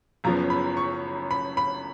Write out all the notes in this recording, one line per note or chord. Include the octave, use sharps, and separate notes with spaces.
F#1 F#2 C#3 F3 B3 A#5
B5
C#6
B5
B5